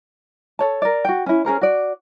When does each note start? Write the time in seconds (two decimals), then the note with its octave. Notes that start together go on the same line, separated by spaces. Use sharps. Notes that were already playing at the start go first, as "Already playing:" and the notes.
0.59 A4 C#5 A5
0.82 A#4 D5
1.05 F#4 G5
1.26 C#4 E4
1.45 C#4 G#4 A#4 C5
1.61 F#4 D5